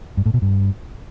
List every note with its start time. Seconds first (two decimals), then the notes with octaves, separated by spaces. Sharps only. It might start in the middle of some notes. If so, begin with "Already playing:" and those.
0.17 G2
0.26 A2
0.34 B2
0.42 G2